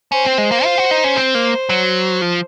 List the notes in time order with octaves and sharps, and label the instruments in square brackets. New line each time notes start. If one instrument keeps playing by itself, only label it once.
[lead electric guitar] C#4 [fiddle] C5
[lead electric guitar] C4
G#3
A#3
F4
F#4
D#4
C#4
C4
A#3
F#3
F3